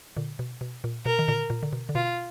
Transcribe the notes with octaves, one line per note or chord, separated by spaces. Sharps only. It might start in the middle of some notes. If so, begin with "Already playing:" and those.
A#2 D3
B2
B2
A#2
B2 A#4
D#3
A#2 D3
A#2
D3
B2
D3
B2 F4